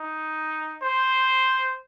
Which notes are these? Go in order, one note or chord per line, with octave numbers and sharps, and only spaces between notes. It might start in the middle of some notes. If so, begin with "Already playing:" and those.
Already playing: D#4
C5